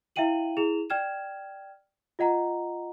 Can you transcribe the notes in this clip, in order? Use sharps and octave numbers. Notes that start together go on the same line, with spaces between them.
E4 E5 F5 G5 D#7 F#7
E4 G#4 E7 F7
D5 G5 F6 G#6 E7
F4 D#5 F#5 A#5